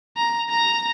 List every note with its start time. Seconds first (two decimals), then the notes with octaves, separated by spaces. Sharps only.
0.17 A#5
0.50 A#5 A#6